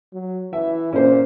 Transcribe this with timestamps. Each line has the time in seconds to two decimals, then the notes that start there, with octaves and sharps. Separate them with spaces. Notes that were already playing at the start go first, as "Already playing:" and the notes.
0.13 F#3
0.53 E3 E5
0.93 A#2 C#4 C5